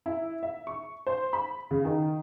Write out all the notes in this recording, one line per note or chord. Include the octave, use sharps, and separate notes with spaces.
E4
E5
C#6
C5
B5
C#3
D#3